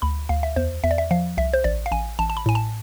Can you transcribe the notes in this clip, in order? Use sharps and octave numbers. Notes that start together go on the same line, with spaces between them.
D2 B5
D2 F5
E5
E2 C5
E2 E5
D5
E5
F3 F5
C2 E5
C5
A1 D5
F5
A1 G#5
A1 A5
A5
B5
A2 G#5
A5